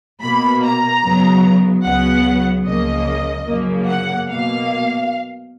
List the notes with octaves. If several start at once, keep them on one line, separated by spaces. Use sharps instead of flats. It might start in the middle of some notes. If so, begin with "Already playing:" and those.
B2 A#3 B5
A#5
F#2 C#3 F#3 B3
C#2 C#3 F#3 B3 F#5
C#2 C#3 F3 A#3 D#5
F#2 C#3 F3 A#3
F#5
B2 A#3 F5